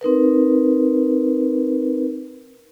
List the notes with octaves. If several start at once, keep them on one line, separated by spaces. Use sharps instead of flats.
C4 D#4 A#4 B4